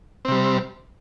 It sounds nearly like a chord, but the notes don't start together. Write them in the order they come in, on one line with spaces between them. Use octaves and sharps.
C4 C3 G3